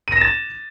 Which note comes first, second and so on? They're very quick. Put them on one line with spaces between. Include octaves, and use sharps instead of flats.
D#7 A#6 E7 A6